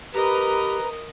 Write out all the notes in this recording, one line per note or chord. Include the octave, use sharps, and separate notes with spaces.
G4 A#4 B4 D#5 A#5